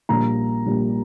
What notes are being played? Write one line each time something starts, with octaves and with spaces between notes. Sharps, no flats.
A#1 A#2 G3 A#3 A#5
A#1 A#2 G3 A#3